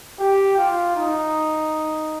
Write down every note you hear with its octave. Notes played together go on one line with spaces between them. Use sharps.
G4
F4
D#4